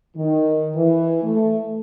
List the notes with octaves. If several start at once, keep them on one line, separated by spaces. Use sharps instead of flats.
D#3
E3
A3